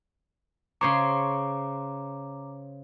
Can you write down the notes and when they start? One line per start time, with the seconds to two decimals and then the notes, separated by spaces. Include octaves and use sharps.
0.81 C#3 C5 C#5 A#5 D6